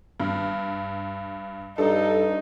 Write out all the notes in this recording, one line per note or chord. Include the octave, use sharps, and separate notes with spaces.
G2
G2 D#4 A4